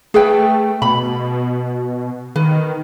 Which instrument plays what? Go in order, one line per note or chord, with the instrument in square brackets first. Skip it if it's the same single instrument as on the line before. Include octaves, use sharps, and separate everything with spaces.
[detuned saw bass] A3 [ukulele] G#4 B4 G5
[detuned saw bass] B2 [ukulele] B5
[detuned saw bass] D#3 [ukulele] B4